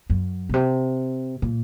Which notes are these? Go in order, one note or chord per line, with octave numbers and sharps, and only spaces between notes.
F#2
B2
C3
A#2